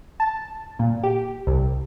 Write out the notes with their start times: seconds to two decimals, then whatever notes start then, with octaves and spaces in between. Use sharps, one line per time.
0.20 A5
0.79 A#2
1.03 G4
1.47 C2